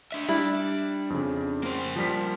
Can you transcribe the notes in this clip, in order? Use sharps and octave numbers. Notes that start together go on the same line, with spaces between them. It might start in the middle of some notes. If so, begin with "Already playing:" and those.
D4 E5
G3 D4 E4
F2 C#3
A#3 C5
F3 G3 B6